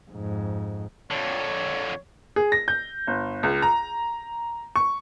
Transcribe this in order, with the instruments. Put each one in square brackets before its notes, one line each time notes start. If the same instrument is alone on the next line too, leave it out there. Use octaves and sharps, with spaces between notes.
[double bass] F2 G#2
[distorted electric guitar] F2 D3 [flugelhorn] C#5
[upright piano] G#4
A#6
G6
G1
C#2
A#5
C#6